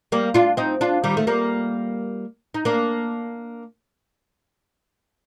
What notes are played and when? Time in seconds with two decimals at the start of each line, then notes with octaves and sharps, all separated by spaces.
0.12 G3 A#3
0.34 D4 F4
0.57 C4 D#4
0.81 D4 F4
1.04 D#3 G3
1.17 A3
1.27 G3 A#3
2.54 D#4
2.65 A#3 D4